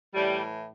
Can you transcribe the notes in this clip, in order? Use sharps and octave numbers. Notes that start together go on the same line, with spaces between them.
A2 E3 G3